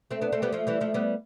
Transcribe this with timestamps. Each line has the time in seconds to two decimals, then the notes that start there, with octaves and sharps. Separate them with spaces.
0.11 A3 C4
0.21 B3 D4
0.32 A3 C4
0.42 G3 B3
0.52 F3 A3
0.67 E3 G3
0.81 F3 A3
0.94 G3 B3